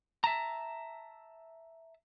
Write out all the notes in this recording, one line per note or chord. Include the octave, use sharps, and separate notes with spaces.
E5 A5 A#5